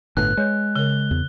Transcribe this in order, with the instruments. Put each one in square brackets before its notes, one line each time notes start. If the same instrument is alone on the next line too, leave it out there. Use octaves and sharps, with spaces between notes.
[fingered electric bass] G1 A2 [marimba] B4 [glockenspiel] F#6
[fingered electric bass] G#3 [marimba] C#5 G6
[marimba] C#3 A#4 [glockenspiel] G7
[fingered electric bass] E2